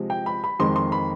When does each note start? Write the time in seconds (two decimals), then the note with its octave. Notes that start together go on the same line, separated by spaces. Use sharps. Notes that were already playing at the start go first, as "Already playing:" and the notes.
Already playing: C3 F3 G#3
0.10 G5
0.26 B5
0.44 B5
0.59 F2 D#3 G#3 C6
0.76 C6
0.92 B5